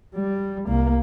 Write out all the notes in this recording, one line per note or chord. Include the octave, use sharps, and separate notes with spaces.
G3
C2 A#3